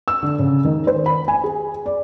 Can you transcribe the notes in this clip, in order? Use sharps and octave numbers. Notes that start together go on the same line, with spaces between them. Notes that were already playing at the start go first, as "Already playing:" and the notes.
E6
D3
C#3
D#3
C5
B5
G#5
G#4
D5